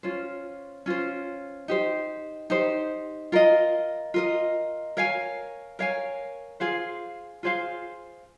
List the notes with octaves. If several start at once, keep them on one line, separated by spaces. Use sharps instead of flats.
C#4 F4 C5
C#4 F4 C5
D#4 G4 C5
D#4 G4 C5
F4 A#4 D#5
F4 A#4 D#5
A#4 C#5 F5 G#5
A#4 C#5 F5 G#5
F4 G#4 C5 F5
F4 G#4 C5 F5